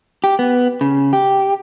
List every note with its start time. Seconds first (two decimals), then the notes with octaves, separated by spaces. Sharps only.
0.24 G4
0.39 B3
0.81 C#3
1.13 G4